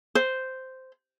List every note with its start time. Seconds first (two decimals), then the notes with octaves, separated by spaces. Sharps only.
0.15 C5